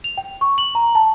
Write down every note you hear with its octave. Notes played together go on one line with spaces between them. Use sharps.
F7
G5
C#6
F#7
A#5
A5